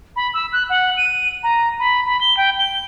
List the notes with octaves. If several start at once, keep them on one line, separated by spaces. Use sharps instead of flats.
B5
E6
F#6
F#5
D#7
A#5
B5
B5
G7
G5
G7